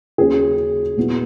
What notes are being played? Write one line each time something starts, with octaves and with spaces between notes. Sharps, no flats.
D#2 C#3 F#3 C#4 G#4
A#2 F#3 B3 E4